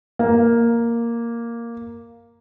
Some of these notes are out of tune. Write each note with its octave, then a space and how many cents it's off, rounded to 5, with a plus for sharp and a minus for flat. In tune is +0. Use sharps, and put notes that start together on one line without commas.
A#3 +0